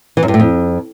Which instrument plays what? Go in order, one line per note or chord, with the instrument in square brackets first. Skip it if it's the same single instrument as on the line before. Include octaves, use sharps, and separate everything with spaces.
[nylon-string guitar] E3
F#2
G2
A2
F2